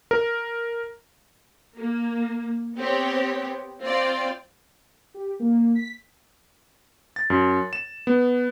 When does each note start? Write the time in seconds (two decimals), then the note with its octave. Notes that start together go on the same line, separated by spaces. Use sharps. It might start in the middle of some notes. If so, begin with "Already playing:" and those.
0.11 A#4
1.77 A#3
2.76 B3 C4 G4 C#5
3.82 C4 F4 D5
5.14 G4
5.40 A#3
5.75 B6
7.16 A6
7.30 F#2
7.73 E7
8.07 B3